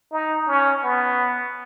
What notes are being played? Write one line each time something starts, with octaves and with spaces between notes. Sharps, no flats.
D#4
C#4
B3